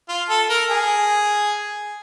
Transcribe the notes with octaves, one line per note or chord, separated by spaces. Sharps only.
F4
A4
A#4
G#4